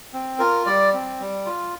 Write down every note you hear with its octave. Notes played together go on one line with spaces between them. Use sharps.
C4
F4 A#4
G3 D5
C4
G3
F4